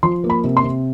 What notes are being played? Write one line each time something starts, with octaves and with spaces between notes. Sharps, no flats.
F3 C6
A#3
B5
C3
C6
C3